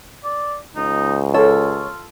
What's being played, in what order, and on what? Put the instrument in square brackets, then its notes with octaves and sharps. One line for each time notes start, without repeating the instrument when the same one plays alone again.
[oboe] D5
[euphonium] C#2 [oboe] D#4
[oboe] F4 [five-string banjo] A4 [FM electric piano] C#5